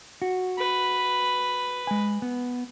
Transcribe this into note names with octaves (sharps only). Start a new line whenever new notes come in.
F#4
B4
G#3 G#5
B3